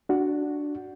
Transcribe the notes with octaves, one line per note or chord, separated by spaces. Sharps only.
D4 F#4